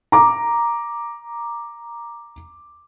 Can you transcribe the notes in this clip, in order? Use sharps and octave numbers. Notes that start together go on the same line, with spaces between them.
A#5 D6